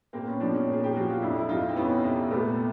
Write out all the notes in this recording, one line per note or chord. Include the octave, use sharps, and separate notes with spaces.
A#2 A#3 C4
B3 C#4
F3 C4 D4
C#4 D#4
A#2
G#4
G4
F3 F#4
F4
F2 D4 E4
E4
F2 D#4 F4
C4
E3 B3 C#4
C3
A#2 A3 B3